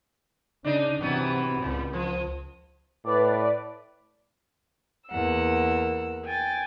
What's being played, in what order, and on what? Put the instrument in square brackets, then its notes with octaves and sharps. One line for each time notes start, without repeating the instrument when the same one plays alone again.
[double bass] C#3 [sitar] D4 D#4
[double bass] C3 C4 [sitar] E3 F#3 B3
[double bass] C#2 [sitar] A2
[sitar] F3
[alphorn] A2 [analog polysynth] B4 D5
[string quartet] E2 A#3 F#5 E6
G5 G#5 A6